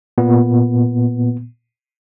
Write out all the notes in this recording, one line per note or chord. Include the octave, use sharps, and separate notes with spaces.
A#2 B3